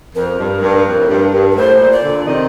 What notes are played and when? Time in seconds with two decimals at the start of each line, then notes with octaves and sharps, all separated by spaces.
0.15 F2 A#4
0.39 G2
0.62 G2
0.86 F2
1.00 A2
1.09 G2
1.33 G2
1.51 A#4
1.56 A2 C5
1.80 A#2
1.91 D5
2.03 A#2 D3
2.26 C3 D#3 D#5